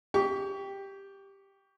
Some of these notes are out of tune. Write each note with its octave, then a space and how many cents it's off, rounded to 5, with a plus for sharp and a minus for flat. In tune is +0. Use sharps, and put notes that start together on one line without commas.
G4 +5 C#6 +35